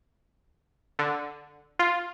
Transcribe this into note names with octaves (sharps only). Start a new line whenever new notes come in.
D3
F4